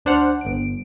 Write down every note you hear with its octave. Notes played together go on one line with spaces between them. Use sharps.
D2 D4 C5 F#5 F6
G1 D7